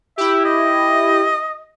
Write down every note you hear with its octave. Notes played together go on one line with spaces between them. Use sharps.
E4 G4 E5
D#5